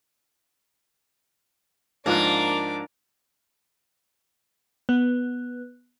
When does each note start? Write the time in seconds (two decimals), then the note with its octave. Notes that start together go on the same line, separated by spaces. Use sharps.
2.06 G#2 F3 A#3 D4 D6 F#6
4.89 B3